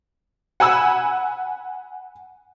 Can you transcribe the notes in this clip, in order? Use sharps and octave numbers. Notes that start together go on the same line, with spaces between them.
F#5 G#5 B5 E6